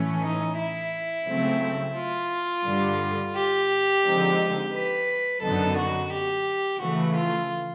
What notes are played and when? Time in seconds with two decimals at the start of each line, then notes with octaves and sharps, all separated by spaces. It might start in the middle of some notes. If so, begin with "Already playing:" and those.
Already playing: A2 E3 A3 C#4
0.23 D#4
0.58 E4
1.28 C#3 F#3 A3 C4
1.96 F4
2.65 G2 D3 G3
3.35 G4
4.05 D3 F3 G#3 C4 D#4
4.74 B4
5.42 F#2 D3 F#3 B3 D#4 A4
5.78 F#4
6.12 G4
6.81 C#3 E3 A3 F#4
7.16 F4